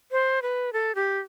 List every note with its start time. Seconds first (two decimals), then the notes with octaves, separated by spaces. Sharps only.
0.11 C5
0.42 B4
0.73 A4
0.95 G4